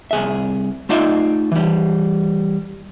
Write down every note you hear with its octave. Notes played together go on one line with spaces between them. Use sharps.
C2 G#4 E5
A3 D#4 F4 D5 E5
E3 G3